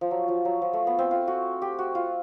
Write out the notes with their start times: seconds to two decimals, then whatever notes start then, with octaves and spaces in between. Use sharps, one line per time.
0.01 F3
0.11 F#3
0.28 F3
0.45 F#3
0.62 F3
0.73 A3
0.87 B3
0.99 C4
1.11 F4
1.28 F#4
1.62 G4
1.79 F#4
1.95 F4